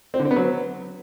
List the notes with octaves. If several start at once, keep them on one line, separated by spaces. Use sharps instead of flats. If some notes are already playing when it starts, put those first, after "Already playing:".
C4
D3
C4
B3
F#3